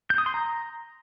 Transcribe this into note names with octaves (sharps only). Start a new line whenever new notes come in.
G6
D#6
C6
A#5